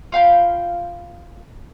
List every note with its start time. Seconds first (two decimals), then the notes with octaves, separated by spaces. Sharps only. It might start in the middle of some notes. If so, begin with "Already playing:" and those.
0.12 F4 F5 G5 B5